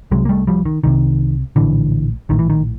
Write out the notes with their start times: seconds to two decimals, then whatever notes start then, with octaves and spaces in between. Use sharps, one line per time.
0.11 C2 C3 F#3 G#3
0.25 A#3
0.29 G3 A3
0.47 F3 G3
0.65 D#3
0.84 C2 C3 D#3
1.56 A#1 A2 D3 E3
2.29 A#1 A2 D#3
2.39 E3
2.50 D#3